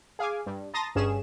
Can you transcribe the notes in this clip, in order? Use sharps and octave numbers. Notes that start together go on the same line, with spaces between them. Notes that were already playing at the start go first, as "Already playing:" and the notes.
G#4 F5 G#5 D6
G2
A5 A#5 C6 D#6 A6 A#6
G1 G2 C#4 G#4 E7